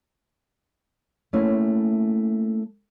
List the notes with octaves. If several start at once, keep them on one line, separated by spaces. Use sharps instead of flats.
A3 A#3 C#4 E4